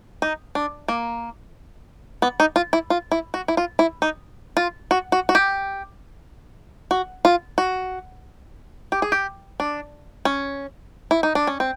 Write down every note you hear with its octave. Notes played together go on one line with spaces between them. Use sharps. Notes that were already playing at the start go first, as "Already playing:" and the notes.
D#4
D4
A#3
B3
D#4
F4
E4
F4
E4
F#4
E4
F4
E4
D#4
F4
F#4
F#4
F#4
G4
F#4
F4
F#4
G4
G#4
G4
D4
C#4
E4
D#4
D4
C#4
C4